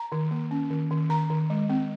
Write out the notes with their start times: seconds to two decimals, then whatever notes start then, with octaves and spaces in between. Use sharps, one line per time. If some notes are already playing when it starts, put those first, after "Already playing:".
Already playing: A#5
0.12 D#3
0.31 A#3
0.51 C#4
0.70 D#3
0.91 D#3
1.10 D#3 A#5
1.30 D#3
1.50 G#3
1.70 C4